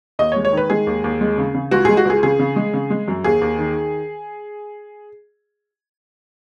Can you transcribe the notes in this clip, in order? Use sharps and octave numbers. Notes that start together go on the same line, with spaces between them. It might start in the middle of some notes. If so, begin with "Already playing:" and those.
D#2 D#5
C#5
G#3
C#5
D#3 B4
G#3 G#4
D#2
D#2
G#3
C#3
C#3
C#2 F#4
G#3 G#4
F#4
C#2 G#4
C#3 G#4
C#3
G#3
C#3
G#3
F#2
D#2 G#4
D#2
D#3